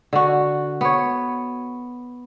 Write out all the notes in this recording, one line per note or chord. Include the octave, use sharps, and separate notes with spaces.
D3 F#4
B3 C#5